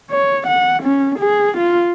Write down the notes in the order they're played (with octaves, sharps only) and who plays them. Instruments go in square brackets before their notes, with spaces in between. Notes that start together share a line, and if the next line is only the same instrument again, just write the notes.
[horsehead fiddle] C#5
F#5
C#4
G#4
F4